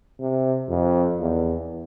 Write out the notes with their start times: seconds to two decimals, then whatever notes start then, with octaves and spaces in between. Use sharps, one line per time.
0.20 C3
0.69 F2
1.20 E2